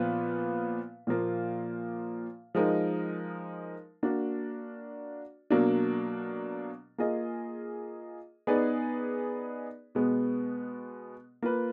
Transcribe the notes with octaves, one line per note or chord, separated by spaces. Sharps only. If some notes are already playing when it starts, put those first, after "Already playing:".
Already playing: A#2 F3 B3 F4 B4
A#2 F3 A#3 F4
F3 G#3 D#4 A#4
A#3 D4 F#4 D5
B2 F#3 A#3 D4
A#3 F4 G#4 D#5
B3 D#4 G#4 B4 D5
B2 G#3 B3
A#3 F4 B4